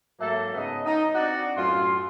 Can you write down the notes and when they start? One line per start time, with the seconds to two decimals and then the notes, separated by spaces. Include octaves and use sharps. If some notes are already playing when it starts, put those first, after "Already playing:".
0.20 G#2 F#3 A3 A#3 A4
0.54 G#2 C#3 B3 D#5
0.84 D#4
1.15 C4 D4 F#4 D5
1.56 F#2 A2 F4 C6